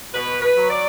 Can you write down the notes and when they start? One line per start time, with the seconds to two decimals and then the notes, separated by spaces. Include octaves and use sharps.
0.13 B2 B4
0.42 B4
0.55 F#3
0.69 D5